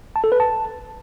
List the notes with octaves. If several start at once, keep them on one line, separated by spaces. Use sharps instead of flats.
A5
A4
B4
A5